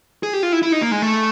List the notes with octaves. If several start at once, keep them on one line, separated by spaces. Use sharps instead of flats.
G#4
G4
F4
E4
E4
D#4
A#3
G#3
A3